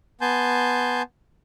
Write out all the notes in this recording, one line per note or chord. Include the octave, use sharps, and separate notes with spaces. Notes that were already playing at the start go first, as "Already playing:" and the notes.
B3 G#5 A5 C6 G6